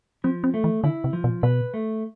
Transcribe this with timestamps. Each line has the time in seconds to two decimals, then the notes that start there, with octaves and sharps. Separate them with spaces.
0.24 F3 C4
0.44 C4
0.54 A3
0.64 E3
0.84 D3 E4
1.04 C3
1.13 F3
1.24 B2
1.43 B2 B4
1.74 A3